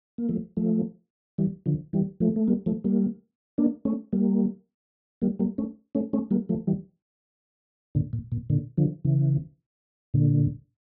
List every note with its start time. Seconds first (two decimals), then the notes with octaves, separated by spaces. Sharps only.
0.18 A#3
0.29 F3 A3
0.57 F3 A3
1.38 E3 G3
1.66 D3 F3
1.93 E3 G3
2.20 F3 A3
2.36 A3
2.48 G3 A#3
2.66 F3 A3
2.84 G3 A#3
3.58 A#3 D4
3.85 A3 C#4
4.13 G3 A#3
5.22 G3 A#3
5.39 G3 A#3
5.58 A3 C#4
5.95 A3 C#4
6.13 A3 C#4
6.31 G3 A#3
6.49 F3 A3
6.67 E3 G3
7.95 A#2 D3
8.13 A#2
8.32 A#2
8.50 A#2 D3
8.78 D3 F3
9.05 C#3 E3
10.14 A#2 D3